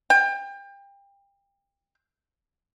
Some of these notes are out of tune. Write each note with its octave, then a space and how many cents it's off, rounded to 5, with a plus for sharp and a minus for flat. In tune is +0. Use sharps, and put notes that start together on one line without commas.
G5 +30